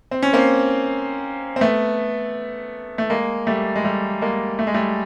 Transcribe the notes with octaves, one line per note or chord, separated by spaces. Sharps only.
C4
C#4
A#3 C4
C4
A3 B3
A3
G#3 A#3
G3 A3
G#3
G3 A3
G#3 A#3
A3
G#3
G3 A3